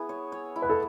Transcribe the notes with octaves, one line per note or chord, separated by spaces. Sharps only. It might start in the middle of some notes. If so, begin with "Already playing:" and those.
Already playing: B3 E4 G#4
C#5
C#5
E4
B4
A4